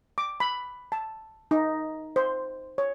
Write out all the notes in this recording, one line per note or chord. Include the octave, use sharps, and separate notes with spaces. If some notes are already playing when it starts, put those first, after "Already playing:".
D6
B5
A5
D#4
C5
C#5